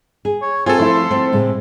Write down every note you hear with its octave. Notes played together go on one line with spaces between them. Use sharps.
G#4
C#5
C4 F4 G#4 A4 G#5
F3 A3 C4 E4 C6
A3 C4
A2 C#3 G#3